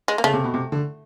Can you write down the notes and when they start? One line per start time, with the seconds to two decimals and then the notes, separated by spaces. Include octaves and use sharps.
0.08 G#3
0.18 A#3
0.24 C#3 A3
0.33 C3
0.44 B2
0.54 C3
0.72 D3